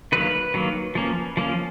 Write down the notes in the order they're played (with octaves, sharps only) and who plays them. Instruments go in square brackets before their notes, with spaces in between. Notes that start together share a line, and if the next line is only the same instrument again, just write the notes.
[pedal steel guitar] D#3 F#3 A#3 B4
D#3 F#3 A#3
F3 A#3 C#4
F3 A#3 C#4